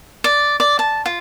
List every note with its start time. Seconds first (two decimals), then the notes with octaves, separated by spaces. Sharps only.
0.24 D5
0.60 D5
0.79 A5
1.06 F4